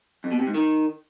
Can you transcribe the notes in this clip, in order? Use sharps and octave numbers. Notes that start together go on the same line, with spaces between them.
F2
B2
C3
G#2
D#3